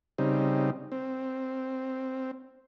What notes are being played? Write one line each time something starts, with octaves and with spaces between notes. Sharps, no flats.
C#3 G3 C4 D#4
C4